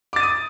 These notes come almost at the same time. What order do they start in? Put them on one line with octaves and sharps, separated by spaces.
D6 A6 D#7 D#6